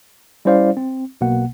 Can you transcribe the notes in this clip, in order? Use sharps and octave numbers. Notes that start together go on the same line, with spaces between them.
G3 C#4 E4 C5 D5 F5
C4
B1 B2 A#3 F#5